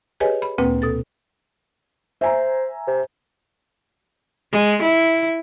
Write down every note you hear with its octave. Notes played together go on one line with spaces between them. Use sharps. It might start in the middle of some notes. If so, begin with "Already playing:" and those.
G4 G#4 B4 C#5 D#5 G#5
B5
D2 A#2 A#3 C4 B4 G5
B2 A4 A6
C5 E5 G#5 A#5
C3
G#3
E4